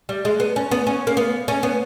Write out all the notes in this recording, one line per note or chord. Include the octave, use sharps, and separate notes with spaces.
G3
G#3
B3
C#4
B3
C#4
A#3
B3
C#4
B3